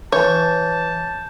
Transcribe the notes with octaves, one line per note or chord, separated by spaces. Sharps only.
E3 C#5 A5 G6